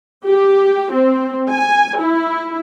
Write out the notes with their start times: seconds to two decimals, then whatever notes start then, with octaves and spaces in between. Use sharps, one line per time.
0.26 G4
0.92 C4
1.49 G#5
1.98 E4